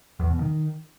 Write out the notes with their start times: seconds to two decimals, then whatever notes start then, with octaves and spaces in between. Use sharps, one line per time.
0.20 E2
0.30 B2
0.40 D#3